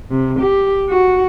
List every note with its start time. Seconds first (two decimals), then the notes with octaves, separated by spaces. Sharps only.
0.11 C3
0.40 G4
0.89 F#4